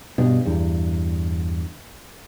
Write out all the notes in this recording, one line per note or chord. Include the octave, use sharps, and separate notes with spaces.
G2 B2
E2 G2